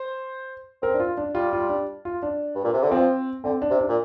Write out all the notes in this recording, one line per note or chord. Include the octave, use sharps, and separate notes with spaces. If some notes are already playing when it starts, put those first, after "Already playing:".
Already playing: C5
C4 A#4
D4
F4
D4
G3 F4
F4
D4
F4
D4
G2
A#2
C3
D3
F3 C4
D3 C4
D4
C3
D4
A#2